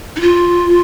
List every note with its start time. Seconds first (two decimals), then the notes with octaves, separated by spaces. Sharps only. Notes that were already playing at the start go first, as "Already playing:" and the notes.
0.16 D#4
0.21 F4